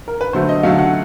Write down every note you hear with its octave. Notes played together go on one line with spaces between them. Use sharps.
A#4
B4
D3 F#3 A3 C5
D#5
D3 F#3 A3 F5
F#5